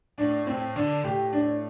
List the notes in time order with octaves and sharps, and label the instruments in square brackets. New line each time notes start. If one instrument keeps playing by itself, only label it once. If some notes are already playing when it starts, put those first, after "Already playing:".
[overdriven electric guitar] A2 [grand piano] D4
[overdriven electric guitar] A2 [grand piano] C4
[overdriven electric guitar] D3 [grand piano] D4
[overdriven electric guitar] A2 [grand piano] G4
[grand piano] D4